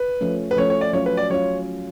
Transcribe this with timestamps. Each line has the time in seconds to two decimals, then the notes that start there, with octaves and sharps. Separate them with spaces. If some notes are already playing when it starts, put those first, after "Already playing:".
Already playing: B4
0.21 F3 A3 C#4
0.51 B4
0.57 F3 A3 C#4 C#5
0.70 C#5
0.81 D5
0.93 F#3 C#4 F4 C#5
1.06 B4
1.17 D5
1.30 F#3 C#4 F4 C#5